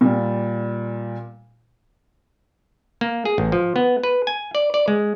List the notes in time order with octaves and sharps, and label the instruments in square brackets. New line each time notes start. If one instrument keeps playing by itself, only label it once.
[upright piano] A#2 G3
[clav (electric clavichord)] A#3
G#4
A1
F3
B3
B4
G#5
D5
D5
G#3